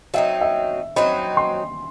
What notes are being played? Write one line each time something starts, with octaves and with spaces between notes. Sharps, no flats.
F#3 C4 D#4 E5
E5
F#3 C4 D#4 B5
C6